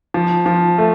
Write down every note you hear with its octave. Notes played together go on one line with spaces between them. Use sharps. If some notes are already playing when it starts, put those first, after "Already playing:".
F3
F3
A3